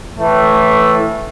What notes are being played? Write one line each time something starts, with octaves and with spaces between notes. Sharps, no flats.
A2 E3 A3